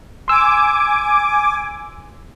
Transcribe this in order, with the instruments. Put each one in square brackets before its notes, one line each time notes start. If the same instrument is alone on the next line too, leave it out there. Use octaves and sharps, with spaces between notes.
[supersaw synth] G#5 D6 [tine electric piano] C6 E6